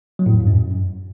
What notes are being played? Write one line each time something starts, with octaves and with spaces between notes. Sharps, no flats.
F#3
A2
F2
G2
F#2